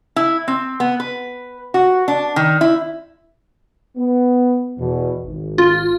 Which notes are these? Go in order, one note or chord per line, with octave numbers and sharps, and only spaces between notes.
E4
C4
B3
B4
F#4
D4
D#3
E4
B3
E2 B2
G#1
F4